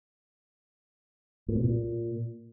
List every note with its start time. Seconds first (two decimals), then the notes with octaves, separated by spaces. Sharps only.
1.48 A2
1.56 B2
1.64 A#2